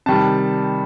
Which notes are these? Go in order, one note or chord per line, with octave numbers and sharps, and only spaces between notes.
C3 D#3 G3 A5